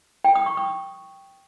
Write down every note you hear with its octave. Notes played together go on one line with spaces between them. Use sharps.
G5
D#6
C#6
D#6